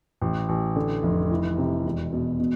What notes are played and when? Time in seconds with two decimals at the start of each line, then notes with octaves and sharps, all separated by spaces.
0.21 A1
0.49 A1
0.76 D3
1.03 F1
1.31 E3
1.58 C3
1.85 E1
2.13 B2
2.40 B2